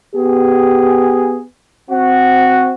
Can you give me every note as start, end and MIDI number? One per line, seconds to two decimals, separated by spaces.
0.16 1.42 59
0.16 1.42 67
0.16 1.42 68
1.90 2.74 60
1.90 2.74 66